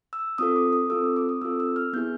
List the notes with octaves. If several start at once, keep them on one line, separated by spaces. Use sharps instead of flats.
E6
C4 F4 A4 D#6
D6
D#6
C4 F4 A4 E6
D6
D6
D#6
C4 F4 A4 E6
E6
F6
B3 E4 G#4 G6